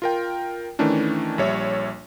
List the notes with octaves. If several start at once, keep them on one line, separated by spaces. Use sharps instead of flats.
F4 A#4 G5
D#3 E3 A3 C#4 D4
A#1 G3 C#5 E5